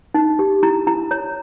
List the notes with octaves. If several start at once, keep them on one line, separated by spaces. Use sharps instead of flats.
D#4
G4
E4 A#5
E4 A#5
C#5 A#5